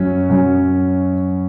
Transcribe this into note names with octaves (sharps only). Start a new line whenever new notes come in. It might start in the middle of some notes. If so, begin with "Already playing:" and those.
Already playing: F#2 F#3 C#4
F#2 F#3 C#4